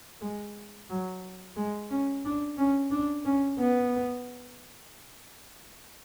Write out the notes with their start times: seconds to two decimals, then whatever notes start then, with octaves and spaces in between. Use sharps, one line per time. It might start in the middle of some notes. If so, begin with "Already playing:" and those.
0.21 G#3
0.90 F#3
1.57 G#3
1.90 C#4
2.25 D4
2.58 C#4
2.91 D4
3.25 C#4
3.60 B3